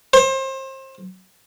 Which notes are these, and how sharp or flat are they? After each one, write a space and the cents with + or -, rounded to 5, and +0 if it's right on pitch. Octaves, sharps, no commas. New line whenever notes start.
C5 +30